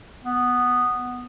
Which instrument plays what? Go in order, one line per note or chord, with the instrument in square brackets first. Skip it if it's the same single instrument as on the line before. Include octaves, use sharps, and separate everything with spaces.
[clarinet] B3